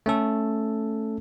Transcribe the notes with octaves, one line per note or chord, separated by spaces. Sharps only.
A3 C#4 A4